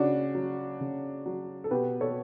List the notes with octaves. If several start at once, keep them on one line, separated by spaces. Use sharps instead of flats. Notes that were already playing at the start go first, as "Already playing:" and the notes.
Already playing: C#3 D4 F#4
F#3
C#3
F#3
A4
B2 G4 B4
A4 C#5